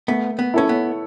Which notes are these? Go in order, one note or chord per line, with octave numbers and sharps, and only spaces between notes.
A3 B3
B3
C#4 E4 A4 C#5
B3